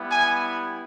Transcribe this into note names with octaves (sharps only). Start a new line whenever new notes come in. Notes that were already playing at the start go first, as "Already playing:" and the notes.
Already playing: G3 B3 E4
G#5